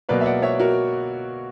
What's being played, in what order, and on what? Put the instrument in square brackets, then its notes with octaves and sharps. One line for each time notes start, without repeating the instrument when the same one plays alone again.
[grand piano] B2 F#3 A#3 B4 D5
E5
D5 F#5
C#5 E5
F#4 A#4